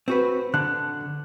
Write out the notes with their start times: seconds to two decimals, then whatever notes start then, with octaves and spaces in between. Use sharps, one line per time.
0.08 C4 F#4 B4
0.54 D3 F#6